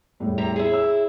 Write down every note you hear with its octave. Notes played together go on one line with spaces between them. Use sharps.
E2 A2 G3
C3 A#5
E4 G#4
C#5 E6